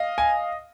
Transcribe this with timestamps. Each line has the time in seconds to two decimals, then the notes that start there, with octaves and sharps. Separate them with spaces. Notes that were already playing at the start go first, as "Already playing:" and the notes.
Already playing: D#5 F5
0.18 G#5